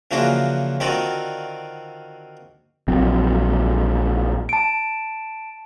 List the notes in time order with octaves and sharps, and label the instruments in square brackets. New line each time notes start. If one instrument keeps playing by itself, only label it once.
[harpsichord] C#3 E3 F3 A#3 D4 F#4
D3 D#3 C4 F4 F#4 D5
[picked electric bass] A#1 F#3 C4
[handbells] A5 D7